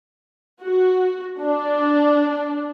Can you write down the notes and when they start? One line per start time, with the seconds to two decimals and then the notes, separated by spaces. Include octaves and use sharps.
0.62 F#4
1.40 D4